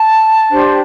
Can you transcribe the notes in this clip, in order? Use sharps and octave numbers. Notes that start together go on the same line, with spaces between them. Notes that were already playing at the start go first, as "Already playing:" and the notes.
Already playing: A5
D4 G4 C5